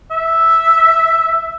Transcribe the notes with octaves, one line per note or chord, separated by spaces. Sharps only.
E5